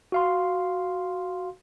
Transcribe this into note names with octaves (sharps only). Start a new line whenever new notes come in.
F#4 F5 C6